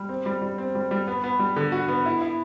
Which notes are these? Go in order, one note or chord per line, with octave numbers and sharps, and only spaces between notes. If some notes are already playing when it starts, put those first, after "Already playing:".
Already playing: G3
C4
G3
G3
C4
G3
G3
B3
B3
G3
D3
F#4
B3
E4
E4